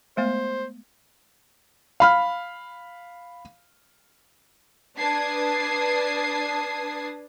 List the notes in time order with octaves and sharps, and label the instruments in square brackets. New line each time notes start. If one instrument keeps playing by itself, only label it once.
[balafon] G#3 A3 B3 [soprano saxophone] C5
[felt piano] F5 B5 F6
[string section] D4 B4 A5 D#6 G#6 C7